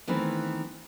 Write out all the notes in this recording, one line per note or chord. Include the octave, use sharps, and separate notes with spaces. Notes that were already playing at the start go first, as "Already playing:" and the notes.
D#3 E3 A3 B3 C4